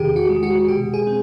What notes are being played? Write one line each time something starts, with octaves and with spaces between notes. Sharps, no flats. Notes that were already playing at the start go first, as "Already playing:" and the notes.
Already playing: E2 C3 D#3 G4 G#4
F#4
G#3
F#4
B2 G4
G#4
C4